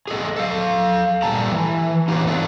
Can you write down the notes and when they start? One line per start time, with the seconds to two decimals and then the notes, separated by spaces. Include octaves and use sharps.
0.08 G#4 A4 D#5
0.36 A4 F5
1.23 A#2 G3 A3 A4 A5 A#5
1.52 E3
2.08 D#4 F4 G4 A#4 B4 C#5
2.26 C4 D4 D#4 F4 A4 B4